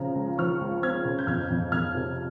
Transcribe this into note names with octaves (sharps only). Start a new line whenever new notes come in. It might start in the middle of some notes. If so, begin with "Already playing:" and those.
Already playing: C#3 F3 C4 A#5
C#2
F3 C#6 F6
C#2
C4 F6 G#6
C#3
G6
F2 F6 G#6
F2
F2 F6 G#6
C3